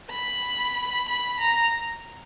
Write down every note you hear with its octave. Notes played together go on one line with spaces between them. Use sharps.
B5
B5
A#5